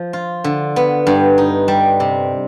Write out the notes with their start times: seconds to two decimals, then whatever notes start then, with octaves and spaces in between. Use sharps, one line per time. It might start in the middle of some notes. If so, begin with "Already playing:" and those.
Already playing: F3
0.13 F4
0.44 D3
0.76 B3
1.07 G2
1.38 D#4
1.68 G3
2.00 C3